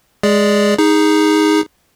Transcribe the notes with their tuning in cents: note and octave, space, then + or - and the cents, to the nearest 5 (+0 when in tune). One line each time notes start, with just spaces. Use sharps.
G#3 +0 G#4 +0 D5 +0
D#4 +10 G#4 -15